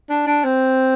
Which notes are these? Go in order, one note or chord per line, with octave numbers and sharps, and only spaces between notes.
D4
D4
C4